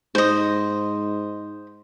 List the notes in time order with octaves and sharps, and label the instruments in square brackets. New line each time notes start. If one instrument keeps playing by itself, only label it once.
[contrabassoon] G#2 [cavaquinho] C5 D#5